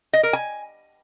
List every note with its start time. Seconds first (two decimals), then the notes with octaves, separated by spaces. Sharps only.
0.13 D#5
0.23 A#4
0.33 G#5